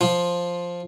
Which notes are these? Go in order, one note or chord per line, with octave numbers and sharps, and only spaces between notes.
F3 F4